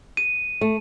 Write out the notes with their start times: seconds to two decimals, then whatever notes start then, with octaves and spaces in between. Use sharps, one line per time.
0.17 D#7
0.61 A3